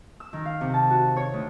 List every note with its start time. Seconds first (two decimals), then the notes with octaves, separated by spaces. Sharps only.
0.20 E6
0.33 D#3
0.45 F5
0.61 C3
0.74 A5
0.91 F#4
1.16 C#5
1.34 D2